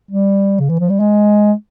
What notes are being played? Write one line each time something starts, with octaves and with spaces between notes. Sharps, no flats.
G3
C#3
E3
F3
G3
G#3